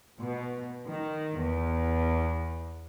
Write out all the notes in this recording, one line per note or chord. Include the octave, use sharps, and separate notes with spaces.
B2
D#3
E2